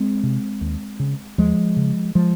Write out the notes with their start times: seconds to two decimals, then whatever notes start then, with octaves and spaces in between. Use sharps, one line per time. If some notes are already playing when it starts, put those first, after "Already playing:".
Already playing: G#3 C4
0.23 C3
0.61 D#2
0.99 C#3
1.38 D#2 F3 G#3
1.77 C#3
2.15 F3 G#3